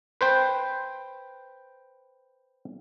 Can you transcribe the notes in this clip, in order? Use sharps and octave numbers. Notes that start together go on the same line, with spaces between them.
B4 C5 G5